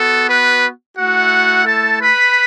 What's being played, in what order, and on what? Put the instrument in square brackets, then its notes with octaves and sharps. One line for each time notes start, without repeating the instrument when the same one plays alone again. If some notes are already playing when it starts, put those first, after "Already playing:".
Already playing: [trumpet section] B3 F#4 A4
B4
A3 E4 F#4 F#5
A4 A5
B4 B5